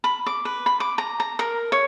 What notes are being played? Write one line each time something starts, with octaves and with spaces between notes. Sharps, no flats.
B5
D6
B4
B5
D6
A#5
A#5
A#4
C#5